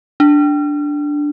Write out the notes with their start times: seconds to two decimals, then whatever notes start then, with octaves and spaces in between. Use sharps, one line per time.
0.20 D4